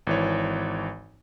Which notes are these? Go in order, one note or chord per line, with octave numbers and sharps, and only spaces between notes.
G#1 E3 C#5